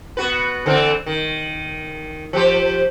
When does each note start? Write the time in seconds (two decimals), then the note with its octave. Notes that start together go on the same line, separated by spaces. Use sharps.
0.17 B3 F#4 B4
0.66 D3 E3 C4
1.06 D#3
2.33 F3 G4 C5